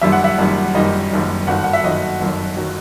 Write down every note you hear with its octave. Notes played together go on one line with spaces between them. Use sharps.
F#1 F#2 D#3 G3 E5
F#5
E5
F#1 F#2 D#3 G3
F#1 F#2 D#3 G3 D#5
F#1 F#2 D#3 G3
G1 F#2 D#3 F#3 F#5
F#5
E5
G1 F#2 D#3 F#3 D#5
G1 F#2 D#3 F#3
D#3 F#3 F#4